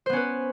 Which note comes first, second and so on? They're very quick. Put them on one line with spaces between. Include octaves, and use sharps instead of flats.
C5 B3 C#4 B4